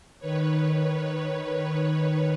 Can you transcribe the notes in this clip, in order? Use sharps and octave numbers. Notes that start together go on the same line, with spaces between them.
D#3 B4 C#5